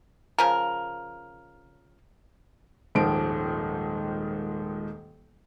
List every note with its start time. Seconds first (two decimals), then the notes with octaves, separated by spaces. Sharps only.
0.39 C#3 F3 A#4
2.95 D#1 G#2 D#3 F3 D7